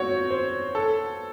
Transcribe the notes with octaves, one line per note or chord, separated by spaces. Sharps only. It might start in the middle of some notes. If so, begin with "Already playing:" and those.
Already playing: C4 F#4 C#5
C5
A4